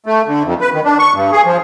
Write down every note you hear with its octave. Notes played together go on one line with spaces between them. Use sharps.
A3
D3
F2
B4
D#3
D4
C#6
G2
G#4
F3